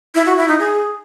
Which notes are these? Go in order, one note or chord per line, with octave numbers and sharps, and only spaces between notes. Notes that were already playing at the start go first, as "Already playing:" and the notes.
E4
F#4
E4
D#4
G#4